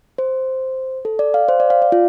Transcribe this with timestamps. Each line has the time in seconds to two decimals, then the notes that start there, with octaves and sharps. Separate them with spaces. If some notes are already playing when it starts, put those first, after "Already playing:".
0.18 C5
1.05 A4
1.19 D5
1.34 F5
1.49 C5
1.60 D5
1.70 F5
1.82 D5
1.92 F4